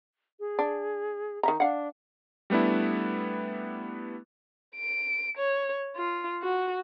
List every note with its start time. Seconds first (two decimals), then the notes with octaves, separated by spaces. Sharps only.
0.40 G#4
0.59 D4
1.43 D#3 E5 A#5
1.60 D4 F5 F#5
2.50 G3 A3 B3 D4 E4
4.76 D7
5.37 C#5
5.96 F4
6.43 F#4